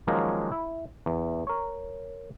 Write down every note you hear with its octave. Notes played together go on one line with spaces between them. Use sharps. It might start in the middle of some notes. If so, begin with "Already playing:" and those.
D#3 F3 F#3 G#3 A#3 C#4
E4
E2
A#4 C#5